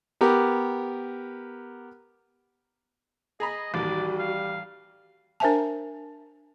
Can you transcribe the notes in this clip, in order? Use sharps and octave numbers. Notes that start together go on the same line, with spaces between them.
B3 G4 A#4
G#4 D#5 A#5 B5
A1 D#2 G3 F#4 D5
F5
D4 A#4 C5 E5 G#5 A5